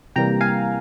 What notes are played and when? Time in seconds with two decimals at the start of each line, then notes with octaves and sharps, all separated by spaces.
0.16 C3 E3 G3 A#3 G5 A#5
0.41 F5 G#5